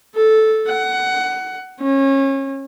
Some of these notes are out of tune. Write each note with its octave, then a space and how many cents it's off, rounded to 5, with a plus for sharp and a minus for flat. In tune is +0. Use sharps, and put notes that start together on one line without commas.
A4 -10
F#5 +15
C#4 -30